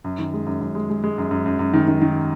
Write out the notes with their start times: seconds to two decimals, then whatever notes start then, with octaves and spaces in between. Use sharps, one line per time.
0.04 F#2
0.19 D#3
0.33 G#3
0.46 F#2
0.61 F#2
0.75 G#3
0.90 G#3
1.04 G#3
1.18 F#2
1.31 F#2
1.46 F#2
1.59 F#2
1.73 D#3
1.88 D#3
2.02 D#3